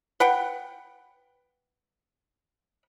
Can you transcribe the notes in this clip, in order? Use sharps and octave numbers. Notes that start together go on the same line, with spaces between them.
B4 F#5 G5